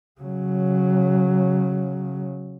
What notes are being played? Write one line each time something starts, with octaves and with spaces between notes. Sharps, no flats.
C#3 F#3